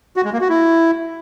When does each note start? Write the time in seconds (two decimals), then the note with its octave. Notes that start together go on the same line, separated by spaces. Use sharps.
0.16 F#4
0.25 G#3
0.33 A#3
0.41 F#4
0.49 E4